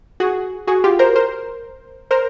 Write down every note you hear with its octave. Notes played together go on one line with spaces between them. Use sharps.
F#4 G#4
F#4 G#4
F4 G4
A#4 C5
A#4 C5
A#4 C5